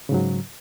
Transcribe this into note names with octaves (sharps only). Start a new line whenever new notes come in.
G#2 C#3 F#3